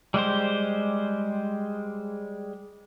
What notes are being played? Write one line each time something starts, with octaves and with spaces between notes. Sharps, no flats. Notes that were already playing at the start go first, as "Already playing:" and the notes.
G3 G#3 G4 C5